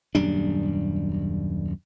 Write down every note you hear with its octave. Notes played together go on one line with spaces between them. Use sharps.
D#1 F#2 G3 D4